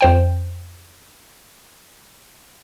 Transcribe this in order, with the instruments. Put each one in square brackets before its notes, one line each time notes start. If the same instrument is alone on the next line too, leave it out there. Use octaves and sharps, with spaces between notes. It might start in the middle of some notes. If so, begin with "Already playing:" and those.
[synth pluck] F2 C5 G5